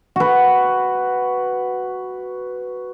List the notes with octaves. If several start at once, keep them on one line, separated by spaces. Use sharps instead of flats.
F#4 B4